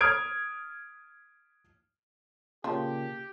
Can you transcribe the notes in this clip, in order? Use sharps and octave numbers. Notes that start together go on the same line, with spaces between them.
D#6 F6 G#6 D7
A#2 C#3 F3 G4